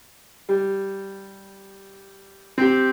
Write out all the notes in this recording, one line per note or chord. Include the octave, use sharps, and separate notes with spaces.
G3
C4 G4